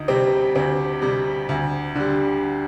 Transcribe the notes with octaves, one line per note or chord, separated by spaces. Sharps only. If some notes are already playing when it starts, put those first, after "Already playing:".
Already playing: D2 D#4
C3 G3 C4
D2 C4
C3 G3
D2
D3 G3